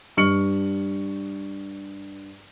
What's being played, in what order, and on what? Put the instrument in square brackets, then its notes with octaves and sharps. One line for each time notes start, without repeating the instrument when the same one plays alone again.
[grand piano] G2 C#6 F6 C#7 F#7